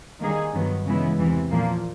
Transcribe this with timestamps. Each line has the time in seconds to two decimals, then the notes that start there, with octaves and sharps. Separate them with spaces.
0.20 D#3 G3 A#3 D#4 G#4
0.53 G2 D#3 F#3 B3
0.85 C#3 E3 G#3 B3 E4
1.18 E2 C3 E3
1.51 A#2 F3 A#3